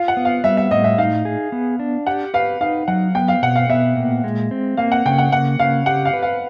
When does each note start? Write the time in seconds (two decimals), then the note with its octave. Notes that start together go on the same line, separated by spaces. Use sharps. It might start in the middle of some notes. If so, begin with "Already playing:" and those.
Already playing: F4 F5
0.08 F#5
0.17 B3
0.25 F5
0.44 G3 E5
0.57 E5
0.71 A2 D#5
0.84 E5
0.98 D#4 F5
1.25 G#4
1.52 B3
1.79 D4
2.07 G4 F#5
2.34 B4 F5
2.61 D#4 F5
2.88 F#3 F#5
3.15 B3 G5
3.28 F5
3.42 B2 F#5
3.56 F5
3.69 B3 E5
3.96 A#2
4.24 G#3
4.51 C4
4.77 A#3 F5
4.92 F#5
5.05 C#3 G5
5.18 F#5
5.32 A#3 F#5
5.59 C#3 F5
5.86 G4 F#5
6.05 F5
6.13 B4
6.23 F5